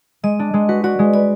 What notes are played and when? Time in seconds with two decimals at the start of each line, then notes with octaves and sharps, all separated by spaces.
0.23 G#3 D#5
0.39 D4
0.54 G#3
0.69 F#4 B4
0.84 F#4 D5
0.99 G#3
1.14 B4 D5